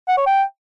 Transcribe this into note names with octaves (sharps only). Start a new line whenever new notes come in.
F#5
C#5
G5